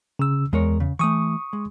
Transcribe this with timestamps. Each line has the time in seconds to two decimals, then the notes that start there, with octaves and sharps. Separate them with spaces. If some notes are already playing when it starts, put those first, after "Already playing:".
0.19 C#3 E6
0.53 E2 G#3 A#4 C#5
0.80 C#3
0.99 E3 A3 C#6 D#6
1.53 G#3